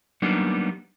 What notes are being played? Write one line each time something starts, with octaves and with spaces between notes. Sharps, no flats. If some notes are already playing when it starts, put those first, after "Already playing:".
F#3 G3 A#3 B3 D4 D#4